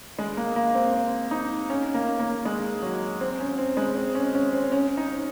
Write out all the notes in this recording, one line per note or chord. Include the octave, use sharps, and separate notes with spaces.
G#3
A#3
A#3
C4
C4
D#4
C#4
A#3
A#3
G#3
F#3
C4
C#4
C4
G#3
C4
C#4
C#4
C4
C#4
D#4